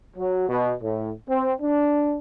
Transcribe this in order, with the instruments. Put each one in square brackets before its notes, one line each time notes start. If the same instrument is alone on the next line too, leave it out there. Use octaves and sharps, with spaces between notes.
[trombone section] F#3
B2
A2
C4
D4